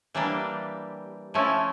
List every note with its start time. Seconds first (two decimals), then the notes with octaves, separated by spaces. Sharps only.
0.15 E3 G3 A#3 D4 G4
1.34 F3 A3 C#4 E4